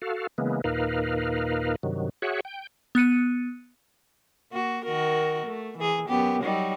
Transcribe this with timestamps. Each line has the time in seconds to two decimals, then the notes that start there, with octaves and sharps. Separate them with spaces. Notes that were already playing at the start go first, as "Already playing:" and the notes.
0.02 F#4 A4 F5
0.38 C#3 E3 G#3 A#3 B3
0.64 D#2 A#2 D#4 A#4 B4 F5
1.83 G2 C3 D#3 F#3
2.22 F#4 G#4 C#5 E5 F#5
2.45 G5
2.95 B3 F#6 C#7 D#7
4.52 A#3 F#4
4.85 D#3 F#4 A#4
5.46 A3
5.78 E3 G#4
6.08 F#2 B3 G4
6.43 F#3 G3 D#4